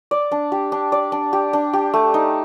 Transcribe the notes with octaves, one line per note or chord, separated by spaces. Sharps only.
D5
D4
G4
D4
D5
D4
G4
D4
G4
A3
D#4